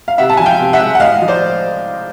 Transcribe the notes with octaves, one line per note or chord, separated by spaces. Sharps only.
F5
C3 E5 F#5
A5
F3 G#5
F5 G5
C3
E5 F#5
G#3
F#5
A2 D#5 F5
F3
C5 D5